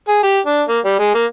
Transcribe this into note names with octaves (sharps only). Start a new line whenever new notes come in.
G#4
G4
D4
A#3
G3
G#3
A#3